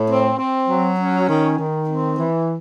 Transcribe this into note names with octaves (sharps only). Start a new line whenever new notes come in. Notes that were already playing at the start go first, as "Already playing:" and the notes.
Already playing: A2
C4
C4
F#3
C#4
D#3
D#3
C4
E3